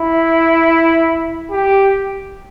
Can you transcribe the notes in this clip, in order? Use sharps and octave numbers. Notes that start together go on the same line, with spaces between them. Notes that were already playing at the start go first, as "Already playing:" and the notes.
Already playing: E4
G4